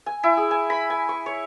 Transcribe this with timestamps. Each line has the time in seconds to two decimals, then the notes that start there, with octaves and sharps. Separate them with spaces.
0.06 G#5
0.23 E4
0.37 G#4
0.51 G#5
0.70 B5
0.90 G#5
1.09 C#6
1.26 C#5